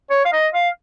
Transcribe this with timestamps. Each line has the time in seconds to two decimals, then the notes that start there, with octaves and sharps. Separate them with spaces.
0.10 C#5
0.25 F5
0.32 D#5
0.54 F5